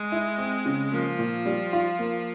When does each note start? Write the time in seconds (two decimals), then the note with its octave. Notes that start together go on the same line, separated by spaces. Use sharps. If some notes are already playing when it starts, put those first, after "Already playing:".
Already playing: G#3
0.12 E4
0.38 C4
0.65 C#3
0.92 F3 A#3
1.19 A#2
1.46 G3
1.73 F4
1.99 A#3